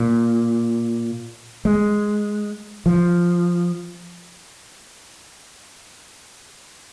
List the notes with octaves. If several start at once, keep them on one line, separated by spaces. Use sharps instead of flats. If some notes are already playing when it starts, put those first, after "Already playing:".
Already playing: A#2
G#3
F3